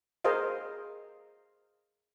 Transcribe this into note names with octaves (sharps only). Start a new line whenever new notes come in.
G#4 A#4 C5 D#5 F5